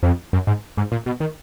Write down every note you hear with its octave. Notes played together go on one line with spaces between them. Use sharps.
F2
F#2
G#2
G#2
A#2
B2
D#3